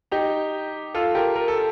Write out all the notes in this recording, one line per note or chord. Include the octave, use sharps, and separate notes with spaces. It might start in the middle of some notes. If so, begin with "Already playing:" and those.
D#4 G4
F4 A4
G4 A#4
A#4
A4